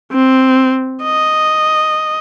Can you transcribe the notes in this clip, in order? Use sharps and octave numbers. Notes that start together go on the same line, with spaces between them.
C4
D#5